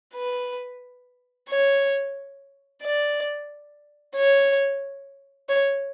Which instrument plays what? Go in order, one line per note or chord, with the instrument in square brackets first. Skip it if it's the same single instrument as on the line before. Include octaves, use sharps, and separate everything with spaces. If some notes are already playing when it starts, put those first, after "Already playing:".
[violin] B4
C#5
D5
C#5
C#5